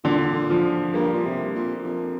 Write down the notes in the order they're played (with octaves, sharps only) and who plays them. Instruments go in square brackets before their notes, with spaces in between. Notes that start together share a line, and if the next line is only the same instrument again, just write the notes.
[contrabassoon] A#2 [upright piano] D3
[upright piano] F3
[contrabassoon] G2 [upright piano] A#3
[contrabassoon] A#2
C3
A#2
F2